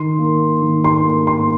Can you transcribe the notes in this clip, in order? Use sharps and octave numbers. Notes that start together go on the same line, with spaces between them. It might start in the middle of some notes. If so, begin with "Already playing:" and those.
Already playing: D#3 C6
A#3
D#3
C6
A#3
C6